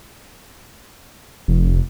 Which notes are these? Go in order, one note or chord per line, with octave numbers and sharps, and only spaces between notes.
F1